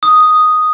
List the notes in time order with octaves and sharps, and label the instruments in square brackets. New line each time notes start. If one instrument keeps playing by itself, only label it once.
[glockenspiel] D#6